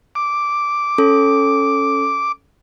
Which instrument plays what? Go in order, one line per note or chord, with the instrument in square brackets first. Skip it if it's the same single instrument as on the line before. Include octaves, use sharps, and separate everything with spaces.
[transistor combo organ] D6
[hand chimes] C#4 A4